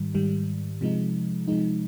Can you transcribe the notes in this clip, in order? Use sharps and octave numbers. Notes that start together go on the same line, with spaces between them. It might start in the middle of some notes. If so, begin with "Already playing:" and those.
Already playing: G#2 D#3 G3
G#2 D#3 G3
C3 F3 G#3 D#4
C3 F3 G#3 D#4